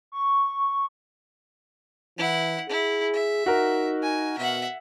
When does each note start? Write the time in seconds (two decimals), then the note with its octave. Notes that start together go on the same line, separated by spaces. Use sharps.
0.12 C#6
2.18 E3 E4 F#5
2.69 E4 G#4
3.14 E5
3.46 D#4 F#4 A#4
4.03 G#5
4.38 B2 E5 F#5